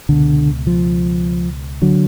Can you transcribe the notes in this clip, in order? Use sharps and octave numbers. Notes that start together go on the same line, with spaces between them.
C#2 B2 D3
F3
D3 F#3